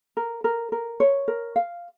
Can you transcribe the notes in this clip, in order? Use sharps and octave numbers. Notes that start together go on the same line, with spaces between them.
A#4
A#4
A#4
C#5
A#4
F5